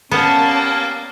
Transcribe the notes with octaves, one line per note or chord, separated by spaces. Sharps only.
G3 A#3 B3 C#4 A5